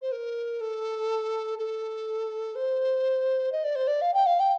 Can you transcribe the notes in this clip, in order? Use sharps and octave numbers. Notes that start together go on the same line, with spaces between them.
C5
A#4
A4
A4
C5
D#5
D5
C5
D5
F5
G5
F5
G5